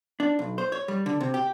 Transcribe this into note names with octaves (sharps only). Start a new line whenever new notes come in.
D4
B1
C5
C#5
G3
D3
C3
G4